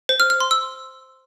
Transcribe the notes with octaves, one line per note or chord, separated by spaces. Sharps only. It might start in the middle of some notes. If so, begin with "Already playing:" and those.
C5
F6
F6
C6
E6